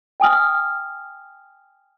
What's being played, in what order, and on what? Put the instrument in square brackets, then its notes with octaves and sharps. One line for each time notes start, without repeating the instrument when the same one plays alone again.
[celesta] G5 G#5 D#6 F6